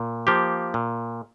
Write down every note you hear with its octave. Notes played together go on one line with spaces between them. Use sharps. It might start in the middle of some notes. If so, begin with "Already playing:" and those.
Already playing: A#2
F3 A#3 G4
A#2